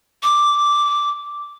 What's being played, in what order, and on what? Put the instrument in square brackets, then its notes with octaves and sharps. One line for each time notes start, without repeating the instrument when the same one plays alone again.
[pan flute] D6